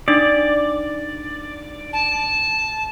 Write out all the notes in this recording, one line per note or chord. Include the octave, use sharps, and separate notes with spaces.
D4 D#4 D5
A5